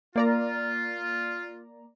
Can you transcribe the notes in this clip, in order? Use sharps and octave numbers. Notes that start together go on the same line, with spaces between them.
A#3 F4 D5 A#5